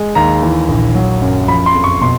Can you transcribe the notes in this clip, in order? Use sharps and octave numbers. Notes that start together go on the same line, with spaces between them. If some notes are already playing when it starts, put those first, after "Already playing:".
Already playing: G#3
D#2 A#5
E3
A#1
F#3
F#2
F3 B5
C6
F2
C#6
B2 C6